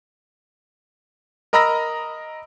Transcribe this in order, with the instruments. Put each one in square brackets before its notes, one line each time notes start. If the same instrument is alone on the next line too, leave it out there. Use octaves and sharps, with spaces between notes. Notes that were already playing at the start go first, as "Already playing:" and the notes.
[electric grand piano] A#4 D#5 A#5 B5 E6 A#6